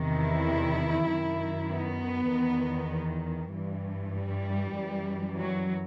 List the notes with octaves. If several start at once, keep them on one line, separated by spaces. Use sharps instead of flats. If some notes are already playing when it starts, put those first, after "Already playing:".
Already playing: E2 C3 D#3
E4
F#2 D#3
B3
E2 D#3
G2 E3
G3
F#2 E3
F#3